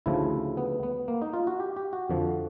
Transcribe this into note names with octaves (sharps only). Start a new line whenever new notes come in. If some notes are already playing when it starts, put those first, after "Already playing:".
D2 C#3 F3 E4
B3
B3
A#3
D#4
F4
F#4
G4
G4
F#4
F2 D3 F3